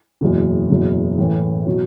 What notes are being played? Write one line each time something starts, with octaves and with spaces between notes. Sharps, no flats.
F#1 E2 B2
F#1 E2 B2 F#3
A1 A2 E3
B2 F#3